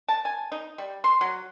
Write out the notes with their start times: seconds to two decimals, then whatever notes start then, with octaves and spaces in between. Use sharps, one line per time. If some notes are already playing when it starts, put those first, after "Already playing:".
0.09 A5
0.25 G#5
0.52 D#4
0.78 G3
1.04 C6
1.21 F#3